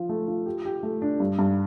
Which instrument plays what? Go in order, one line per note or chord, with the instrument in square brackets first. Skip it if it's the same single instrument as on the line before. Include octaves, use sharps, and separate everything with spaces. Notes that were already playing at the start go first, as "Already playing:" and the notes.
Already playing: [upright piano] F3 F4
A3
F4
G4
G4
A3
D4
G2
G2